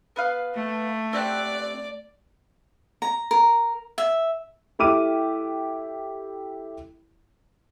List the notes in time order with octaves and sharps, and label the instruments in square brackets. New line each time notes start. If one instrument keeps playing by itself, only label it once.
[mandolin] B3 B4 F5
[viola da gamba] A3
[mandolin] C4 G4 F#5 [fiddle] D5
[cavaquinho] A#5
A#4
E5
[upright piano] A3 E4 G4 D6 F6 D#7